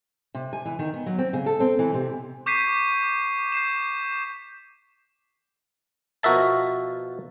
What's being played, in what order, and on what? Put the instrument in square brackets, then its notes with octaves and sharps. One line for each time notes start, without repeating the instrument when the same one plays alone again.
[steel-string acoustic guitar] C3
G#5
E3
D#3
B3
F#3
C4
C#3
A4
C4
E3
C3
[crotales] C#6 D6 G6 B6 C7 D#7
G6 C7 E7
[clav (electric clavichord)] B2 F3 F#4 A#4 E5 A5